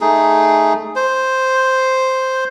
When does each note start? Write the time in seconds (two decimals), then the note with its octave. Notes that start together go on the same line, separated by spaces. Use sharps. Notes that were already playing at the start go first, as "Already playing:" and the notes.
0.01 A3 D#4 G#4
0.95 C5